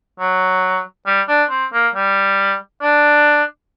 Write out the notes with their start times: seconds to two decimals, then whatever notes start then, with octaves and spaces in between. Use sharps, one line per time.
0.20 F#3
1.06 G3
1.28 D4
1.50 C4
1.73 A#3
1.95 G3
2.82 D4